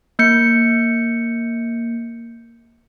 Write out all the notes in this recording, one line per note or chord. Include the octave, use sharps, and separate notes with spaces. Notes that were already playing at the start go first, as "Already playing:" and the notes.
A#3 G6 C#7